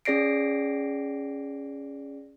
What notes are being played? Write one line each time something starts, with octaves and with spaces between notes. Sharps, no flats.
C#4 G#4 D5 A#6 C7 D7